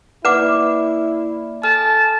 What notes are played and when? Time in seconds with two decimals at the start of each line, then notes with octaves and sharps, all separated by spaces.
0.25 A#3 E4 B4 D5 F#5 D6
1.63 A4 G#5 A5 F6